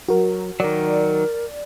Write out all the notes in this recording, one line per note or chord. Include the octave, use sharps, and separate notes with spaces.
F#3 F#4 A#4
D#3 F#3 A#4 D5